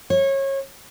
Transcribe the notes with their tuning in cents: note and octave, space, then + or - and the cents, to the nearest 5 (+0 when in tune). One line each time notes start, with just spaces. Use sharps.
C#5 -25